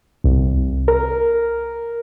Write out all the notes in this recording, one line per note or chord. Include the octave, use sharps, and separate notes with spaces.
C2
A#4